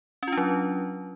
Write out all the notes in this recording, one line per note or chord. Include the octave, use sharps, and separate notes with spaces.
F#3 C#4 D4 F4